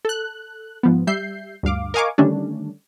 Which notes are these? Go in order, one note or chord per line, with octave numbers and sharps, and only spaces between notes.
A4 F#6
G#2 F3 B3
G3 E5 G6 C7
D2 G2 F5 D6
A#4 D#5 F5 G#5 C#6 D6
D3 D#3 G3 A3 C#4 D4